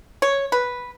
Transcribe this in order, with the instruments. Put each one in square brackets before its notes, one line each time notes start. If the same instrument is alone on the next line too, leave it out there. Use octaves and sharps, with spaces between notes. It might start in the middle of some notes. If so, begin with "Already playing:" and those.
[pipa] C#5
B4